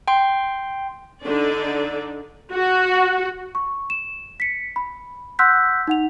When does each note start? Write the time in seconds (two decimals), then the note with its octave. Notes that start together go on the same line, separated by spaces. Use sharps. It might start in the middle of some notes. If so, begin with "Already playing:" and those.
0.08 G5 C6
1.23 D3 D4 D#4 D5
2.53 F#4
3.55 C#6
3.90 E7
4.40 B6 C#7
4.76 B5
5.39 F#5 C6 E6 F#6 G6 B6
5.88 D#4 F#5 F7